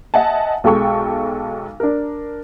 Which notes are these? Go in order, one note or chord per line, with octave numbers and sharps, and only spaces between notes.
D#5 E5 F#5 G#5 A5
B1 G#3 A4 G5 C#6
D4 A#4